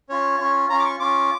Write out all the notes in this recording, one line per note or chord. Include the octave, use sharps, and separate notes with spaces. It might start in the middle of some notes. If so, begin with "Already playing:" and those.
C#4 F4 C#5
C#4 F4
C#4 F4 A#5
D6
C#6
C#4 F4 D6